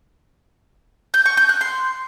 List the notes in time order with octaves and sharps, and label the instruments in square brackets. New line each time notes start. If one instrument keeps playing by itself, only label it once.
[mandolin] G6
C#6
G6
F#6
C6